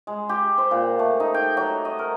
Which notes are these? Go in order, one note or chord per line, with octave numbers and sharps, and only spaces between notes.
G#3
G4
C5
A#2
A3
D#4
G5
F#3
D#5
A#4